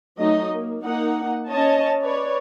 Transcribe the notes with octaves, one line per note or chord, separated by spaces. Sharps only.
F#3 A3 D#4 D#5
A#3
A#3 D#4 F#5
C#4 C#5 D#5 A5
B4 C#5 D5